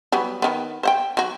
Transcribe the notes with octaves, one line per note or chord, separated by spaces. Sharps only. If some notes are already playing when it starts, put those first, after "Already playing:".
F#3 G3 B3
D#3 B3
C5 F#5 G5
F#3 F#4